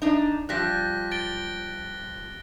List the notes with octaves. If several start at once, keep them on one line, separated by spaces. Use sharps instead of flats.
D4 D#4
F3 G3 F#6 A#6 B6
A6 D7 G7